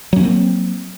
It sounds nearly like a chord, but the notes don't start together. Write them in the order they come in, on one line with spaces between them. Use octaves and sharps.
F#3 C#4 A#3 C4